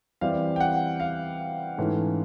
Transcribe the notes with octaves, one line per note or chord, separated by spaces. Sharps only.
E3 G3 C4 E4 F5
G5
F#5
F5
G#2 E3 A3 C#4